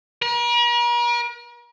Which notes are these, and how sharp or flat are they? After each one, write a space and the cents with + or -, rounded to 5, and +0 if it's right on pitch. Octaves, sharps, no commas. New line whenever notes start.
A#4 +45